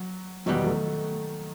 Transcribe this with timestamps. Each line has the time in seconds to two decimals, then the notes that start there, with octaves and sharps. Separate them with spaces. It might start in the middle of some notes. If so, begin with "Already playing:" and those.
Already playing: F#3
0.46 E2 B2 D#3 F#3 G3 B3
0.64 F#3 A3